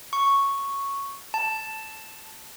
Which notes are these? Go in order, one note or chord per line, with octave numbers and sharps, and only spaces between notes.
C#6
A5